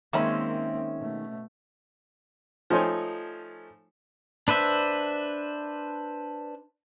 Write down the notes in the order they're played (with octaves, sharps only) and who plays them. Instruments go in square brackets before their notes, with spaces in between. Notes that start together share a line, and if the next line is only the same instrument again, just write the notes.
[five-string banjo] D#3 G#3 B5 [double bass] A#3 C4 [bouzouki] C#4 E5
[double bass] B2 A3
[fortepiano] F3 A3 D#4 C#5 G#5 C6
[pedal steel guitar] D4 B4 C5 E5